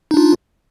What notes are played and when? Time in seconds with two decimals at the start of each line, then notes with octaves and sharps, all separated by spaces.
0.11 D#4
0.14 D4
0.17 F4